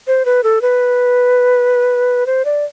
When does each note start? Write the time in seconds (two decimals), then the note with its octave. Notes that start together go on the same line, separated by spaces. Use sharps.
0.07 C5
0.25 B4
0.44 A4
0.62 B4
2.26 C5
2.45 D5